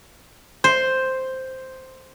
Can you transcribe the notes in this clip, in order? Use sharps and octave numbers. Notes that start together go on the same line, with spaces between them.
C5